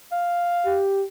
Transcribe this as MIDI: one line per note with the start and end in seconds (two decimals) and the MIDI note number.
0.12 0.82 77
0.66 1.04 67